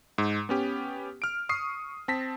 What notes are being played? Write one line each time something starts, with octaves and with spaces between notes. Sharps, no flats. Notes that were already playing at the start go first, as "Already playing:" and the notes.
G#2
B3 C#4 G4
F6 D7
C#6 D#6 C7
C4 A5 A#6 B6